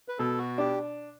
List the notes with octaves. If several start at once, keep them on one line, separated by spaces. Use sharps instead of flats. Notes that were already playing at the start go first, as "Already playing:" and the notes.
B4
B2 A4
F#4
D4 G4